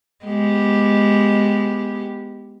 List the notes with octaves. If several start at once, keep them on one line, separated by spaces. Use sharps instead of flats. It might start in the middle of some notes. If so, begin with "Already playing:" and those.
G#3 B3 G4